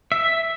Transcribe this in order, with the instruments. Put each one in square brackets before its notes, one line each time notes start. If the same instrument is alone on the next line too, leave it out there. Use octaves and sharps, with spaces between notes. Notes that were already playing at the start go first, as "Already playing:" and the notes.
[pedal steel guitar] E5